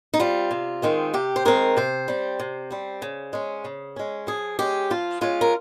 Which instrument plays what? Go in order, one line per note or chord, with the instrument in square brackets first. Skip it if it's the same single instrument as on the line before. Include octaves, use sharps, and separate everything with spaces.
[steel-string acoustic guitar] D#4
G3 C4 F4
C3
D#3 G#3 C4
C3 G4
C5
D#3 G#3 C4 A#4
C3 C5
G3 C4
C3
G3 C4
C#3
G#3 C#4
C#3
G#3 C#4
F3 G#4
G#3 C#4 G4
F3 F4
G#3 C#4 F4
A#4